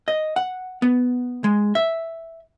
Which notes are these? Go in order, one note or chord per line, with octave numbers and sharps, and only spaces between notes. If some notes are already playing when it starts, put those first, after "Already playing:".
D#5
F#5
B3
G#3
E5